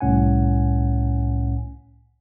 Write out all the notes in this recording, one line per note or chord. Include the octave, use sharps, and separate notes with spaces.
C2 A2 C#4 F#5 G#5